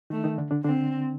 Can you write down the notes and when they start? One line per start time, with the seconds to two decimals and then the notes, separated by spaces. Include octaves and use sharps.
0.10 D#3 A3 D#4
0.24 D#3 D#4
0.38 D3 D4
0.51 D3 D4
0.64 D3 C4 D4